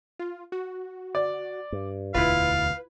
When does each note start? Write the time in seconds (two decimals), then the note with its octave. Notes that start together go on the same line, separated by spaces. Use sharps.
0.19 F4
0.52 F#4
1.15 D5
1.72 G2
2.14 E1 D2 E4 F4 B4 F5